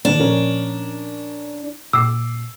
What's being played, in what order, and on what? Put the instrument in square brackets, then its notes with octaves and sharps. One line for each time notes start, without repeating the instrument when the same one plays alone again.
[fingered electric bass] D#3 F3 A#3 [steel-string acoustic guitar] D4
[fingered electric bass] A#2 F3 [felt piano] C#4 A#4
[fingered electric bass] A#2 [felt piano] D6 C7 [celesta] E6